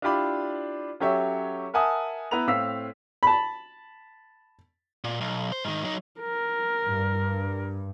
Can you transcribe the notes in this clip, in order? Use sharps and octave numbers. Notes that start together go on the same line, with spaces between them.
D4 E4 F4 G4 D5 B5
F#3 C#4 G4 A4 C#5 E5
A#4 E5 F#5 G#5 A5 D#6
B3 E4 B4 A#5 F7
A2 C4 F5 E6 B6
A5 B5
A#2
B1
C5
G#2 D#3
F#3 D#4
A#4
G2